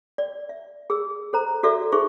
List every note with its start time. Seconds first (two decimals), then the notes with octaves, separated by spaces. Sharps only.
0.18 D5
0.49 E5
0.90 G#4 E6
1.33 A4 C5 A#5
1.63 F#4 A4 D5 E5
1.92 D#4 G#4 C5 E5 C#6 D6